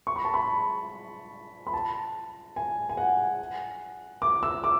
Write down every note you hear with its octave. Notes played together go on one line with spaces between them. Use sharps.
C#6
B5
A5
B5
B5
A5
G#5
G#5
F#5
D6
E6
D6